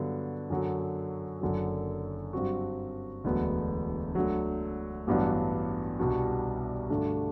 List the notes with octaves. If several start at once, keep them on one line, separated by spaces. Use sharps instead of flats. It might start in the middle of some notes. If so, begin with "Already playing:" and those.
Already playing: G2 D3 F#3 B3
F#2 D3 F#3
F#1 F#2 D3 F#3
G2 F#3 C4 F#4
E1 D2 D3 F#3 B3
D2 D3 F#3
A1 G2 F#3 B3 D4
C2 B2 G3 D4 F#4
G2 D3 A3 D4 F#4